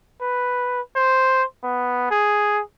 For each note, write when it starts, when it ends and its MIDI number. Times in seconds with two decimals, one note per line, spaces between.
0.21 0.81 71
0.96 1.43 72
1.63 2.08 59
2.11 2.61 68